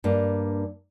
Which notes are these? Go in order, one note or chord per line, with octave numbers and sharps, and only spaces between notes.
G2 A#3 D4